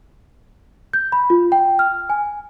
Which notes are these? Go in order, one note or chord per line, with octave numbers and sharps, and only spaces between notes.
G6
B5
F4
G5
F6
G#5